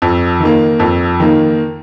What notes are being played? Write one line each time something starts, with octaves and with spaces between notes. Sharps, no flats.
F2
D#3
A#3
F2
D#3 A#3